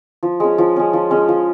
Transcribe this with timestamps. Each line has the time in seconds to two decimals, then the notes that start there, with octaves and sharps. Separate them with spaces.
0.23 F3
0.40 G#3 C#4
0.58 F3
0.76 G#3 C#4
0.93 F3
1.11 G#3 C#4
1.28 F3